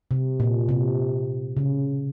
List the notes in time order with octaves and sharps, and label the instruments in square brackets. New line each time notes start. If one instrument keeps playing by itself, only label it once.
[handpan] C3
A#2
C3
C#3